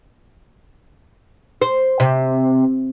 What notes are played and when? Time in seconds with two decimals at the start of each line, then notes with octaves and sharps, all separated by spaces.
1.62 C5
2.00 C3